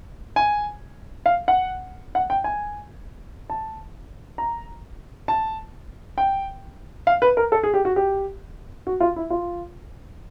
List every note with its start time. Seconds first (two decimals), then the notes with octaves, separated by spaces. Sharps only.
0.36 G#5
1.26 F5
1.48 F#5
2.15 F#5
2.30 G5
2.44 G#5
3.50 A5
4.38 A#5
5.28 A5
6.18 G5
7.07 F5
7.22 B4
7.37 A#4
7.52 A4
7.63 G#4
7.74 G4
7.85 F#4
7.96 G4
8.87 F#4
9.00 F4
9.16 E4
9.30 F4